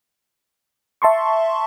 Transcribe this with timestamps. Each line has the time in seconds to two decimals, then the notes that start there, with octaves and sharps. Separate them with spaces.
1.02 E5 A5 C6 C#6